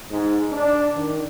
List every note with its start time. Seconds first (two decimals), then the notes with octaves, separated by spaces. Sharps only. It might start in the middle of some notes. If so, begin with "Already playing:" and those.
0.11 G#2
0.52 D4
0.95 D#3